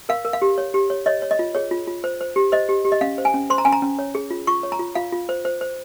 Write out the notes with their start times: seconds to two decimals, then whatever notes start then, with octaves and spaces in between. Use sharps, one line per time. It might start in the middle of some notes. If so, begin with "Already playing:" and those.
0.09 A#4 F5
0.25 A#4
0.33 F5
0.42 G4
0.58 C#5
0.74 G4
0.90 C#5
1.06 C#5 D#5
1.22 C#5
1.31 D#5
1.39 F4
1.55 G#4 C#5
1.71 F4
1.88 F4
2.04 C5
2.21 C5
2.36 G4
2.52 C5 D#5
2.69 G4
2.85 G4
2.92 D#5
3.01 C#4 F5
3.18 C5
3.25 G#5
3.34 C#4
3.50 C5 C6
3.58 A#5
3.65 C#4 G#5
3.72 A#5
3.82 C#4
3.99 C#5
4.15 G#4
4.31 F4
4.47 F4 C#6
4.63 C#5
4.72 A#5
4.79 F4
4.95 F4 F5
5.12 F4
5.29 C5
5.45 C5
5.61 C5